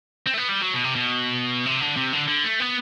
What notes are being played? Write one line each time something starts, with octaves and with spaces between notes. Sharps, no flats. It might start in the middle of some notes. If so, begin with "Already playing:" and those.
C4
A3
B3
G3
F#3
B2
C3
B2
C3
D3
C3
D3
D3
A3
B3